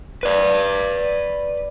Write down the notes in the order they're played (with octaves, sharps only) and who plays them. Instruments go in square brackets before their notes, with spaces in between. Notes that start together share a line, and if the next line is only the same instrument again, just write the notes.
[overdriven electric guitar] B4 D5